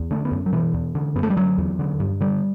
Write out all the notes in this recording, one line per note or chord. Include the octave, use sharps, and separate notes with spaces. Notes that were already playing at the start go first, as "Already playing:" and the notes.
Already playing: E2
D3 A3
B3
F#2
F#3
B2 E3
E2
D3
F#2 B3
A3
G3
D3 F#3
E2
D3
G2
D3 G3